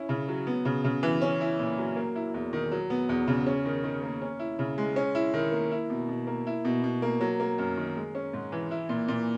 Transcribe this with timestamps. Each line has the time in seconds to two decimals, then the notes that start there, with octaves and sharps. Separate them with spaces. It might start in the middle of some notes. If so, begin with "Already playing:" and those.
Already playing: C#4 E4
0.09 C#3
0.28 F#3
0.47 B3
0.65 C#3
0.84 C#3
1.03 E3
1.21 C#4
1.41 E4
1.59 A#2
1.78 F#3
1.96 A#3
2.15 E4
2.34 E2
2.53 D#3
2.72 F#3
2.90 B3
3.09 E2
3.28 C#3
3.46 C#4
3.65 D#3
3.84 D#3
4.03 A#3
4.22 C#4
4.39 E4
4.59 C#3
4.78 G#3
4.96 C#4
5.15 E4
5.34 D#3
5.52 A#3
5.71 E4
5.90 B2
6.09 B2
6.27 A#3
6.47 E4
6.65 B2
6.83 B2
7.02 A#3
7.21 F#3
7.40 A#3
7.58 F#2
7.77 D#3
7.96 G#3
8.15 C#4
8.33 G#2
8.52 E3
8.71 E4
8.89 A#2
9.08 A#2